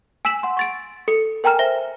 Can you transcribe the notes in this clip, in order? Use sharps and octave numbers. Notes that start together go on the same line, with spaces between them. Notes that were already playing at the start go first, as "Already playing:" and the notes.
G#5 E6 B6 E7 F#7
F#5 C6
C#6 A6 D7
A4 C#7
A#4 G5 G#5 A#5 F6 E7
C5 E5 A#6 G7